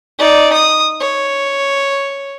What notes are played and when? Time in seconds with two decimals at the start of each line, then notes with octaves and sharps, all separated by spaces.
0.19 D#4 D5
0.53 D#6
1.00 C#5